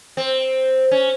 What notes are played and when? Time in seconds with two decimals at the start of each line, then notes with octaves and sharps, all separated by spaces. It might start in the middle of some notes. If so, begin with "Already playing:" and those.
0.17 C4
0.91 C#4